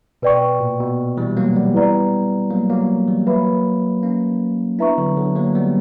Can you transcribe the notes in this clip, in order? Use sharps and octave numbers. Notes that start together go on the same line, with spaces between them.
B2 B4 D5 G5 C#6
A#2
B2
E3 G3
F#3 A#3
G3 B3
E4 B4 D5 A#5
F#3 A#3
F#3 A#3
E3 G3
F#3 A#3 B4 E5 B5
A#3 C#4
B3 D4 E4 B4 E5 A#5 C#6
D3 F#3
D3 F#3
F#3 A#3
G3 B3